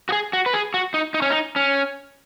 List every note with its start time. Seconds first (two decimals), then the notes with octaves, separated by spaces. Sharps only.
0.09 F#4
0.12 G#4
0.33 F#4
0.46 B4
0.54 G#4
0.74 F#4
0.94 D#4
1.14 D#4
1.22 C#4
1.30 D#4
1.56 C#4